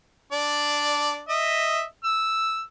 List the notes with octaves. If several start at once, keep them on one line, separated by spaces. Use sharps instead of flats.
D4 D5
D#5 E5
E6